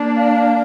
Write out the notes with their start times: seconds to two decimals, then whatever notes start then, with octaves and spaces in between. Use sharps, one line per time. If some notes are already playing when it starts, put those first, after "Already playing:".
Already playing: A#3 D4
0.16 F5